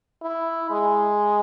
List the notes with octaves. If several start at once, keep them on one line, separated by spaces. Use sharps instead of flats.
E4
G#3